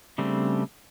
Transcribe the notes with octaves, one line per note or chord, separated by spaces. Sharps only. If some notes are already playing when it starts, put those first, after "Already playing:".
C#3 G3 A3 C4 D4